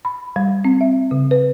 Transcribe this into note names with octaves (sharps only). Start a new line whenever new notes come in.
B5
G3
C4
E5
C#3
B4